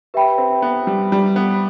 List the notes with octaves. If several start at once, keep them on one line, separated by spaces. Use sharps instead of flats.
G4 B4 E5 G5 B5
C4
B3
G3
G3
B3